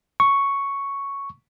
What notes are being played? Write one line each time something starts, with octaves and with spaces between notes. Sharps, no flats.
C#6